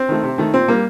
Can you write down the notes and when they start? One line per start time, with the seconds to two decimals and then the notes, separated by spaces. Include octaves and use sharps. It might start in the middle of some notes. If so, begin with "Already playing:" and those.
Already playing: C4
0.09 D#3 A3
0.23 C3
0.38 D#3 A3
0.54 A#2 C4
0.68 G3 A#3